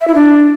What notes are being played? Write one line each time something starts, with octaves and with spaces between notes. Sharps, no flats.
E5
E4
D4